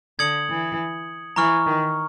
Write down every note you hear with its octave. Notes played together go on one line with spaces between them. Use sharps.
D3 D#6 G#6 C#7 F#7
E3
E3 A#5 C#6 F6
D#3